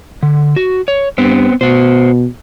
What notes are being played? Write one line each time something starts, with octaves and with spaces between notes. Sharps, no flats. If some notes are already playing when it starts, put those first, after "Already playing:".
D3
F#4
C#5
G2 B3 C4
B2 F#4 C5